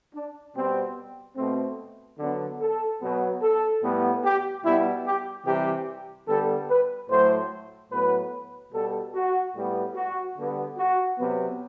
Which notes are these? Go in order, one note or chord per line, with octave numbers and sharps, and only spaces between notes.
D4
B2 G3 B3 C4
B2 A3 C4
D3 F#3 B3 D4
A4
B2 F#3 B3
A4
A2 G3 B3
G4
B2 G3 B3 E4
G4
C3 E3 G3 G4
D3 G3 B3 A4
B4
A2 F#3 A3 C5
A2 F#3 B3 B4
B2 G3 B3 A4
F#4
A2 G3 B3
F#4
D3 G3 B3
F#4
C3 F#3 B3